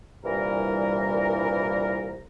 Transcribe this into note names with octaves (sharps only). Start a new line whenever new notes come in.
C2 G2 A#2 E3 G3 A#4